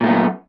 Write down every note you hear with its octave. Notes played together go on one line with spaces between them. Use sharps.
F#2 A#2 A3 B3